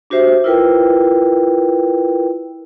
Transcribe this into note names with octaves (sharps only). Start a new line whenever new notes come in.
D4 F#4 G4 C5 E5
E4 F4 A#4 B4 G5